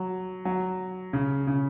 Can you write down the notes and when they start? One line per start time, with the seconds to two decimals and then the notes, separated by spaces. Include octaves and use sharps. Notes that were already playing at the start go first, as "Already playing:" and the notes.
Already playing: F#3
0.45 F#3
1.13 C#3
1.47 C#3